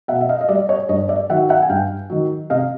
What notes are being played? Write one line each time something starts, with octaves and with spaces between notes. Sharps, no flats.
B2 E5 F#5
E5
D#5 F5
D#5
G3 D5 E5
C#5 D#5
G2 C#5 D#5
D5 E5
D#3 F#3 E5 F#5
E5 F#5
G#5
G2 F5 G5
D#3 F#3
C3 D#5 F5